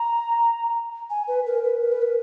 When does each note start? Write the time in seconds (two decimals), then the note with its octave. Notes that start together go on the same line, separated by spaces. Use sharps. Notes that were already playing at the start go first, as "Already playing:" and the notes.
Already playing: A#5
1.10 G#5
1.28 B4
1.46 A#4
1.64 B4
1.82 A#4
1.92 B4
2.02 A#4